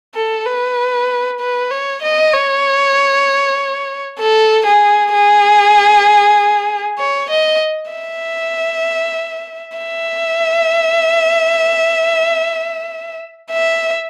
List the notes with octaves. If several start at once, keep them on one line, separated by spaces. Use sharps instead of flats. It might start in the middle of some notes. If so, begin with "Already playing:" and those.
A4
B4
B4
C#5
D#5
C#5
A4
G#4
G#4
C#5
D#5
E5
E5
E5